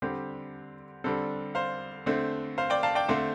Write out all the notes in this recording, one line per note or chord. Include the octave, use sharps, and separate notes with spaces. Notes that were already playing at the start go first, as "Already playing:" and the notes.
D3 G3 C4 G4
D3 G3 C4 A4
C5 F5
D3 A3 C4
C5 F5
D5 G5
F5 A5
D5 G5
D3 A3 C4 C5 F5